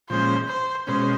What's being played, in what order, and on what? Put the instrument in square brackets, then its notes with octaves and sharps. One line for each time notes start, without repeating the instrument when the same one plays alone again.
[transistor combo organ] A#2 F3 G#3 C#4 [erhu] C5
[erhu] C5
[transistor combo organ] B2 G#3 C#4 [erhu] C5